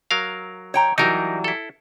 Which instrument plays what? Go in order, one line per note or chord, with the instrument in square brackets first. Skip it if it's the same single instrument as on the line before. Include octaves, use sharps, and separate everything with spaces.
[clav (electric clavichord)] F#3 A#4 F5
[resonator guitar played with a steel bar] C#5 G5 A#5
[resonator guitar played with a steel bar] E3 F#3 G3 [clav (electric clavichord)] D#4 A#4
[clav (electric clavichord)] E4 A4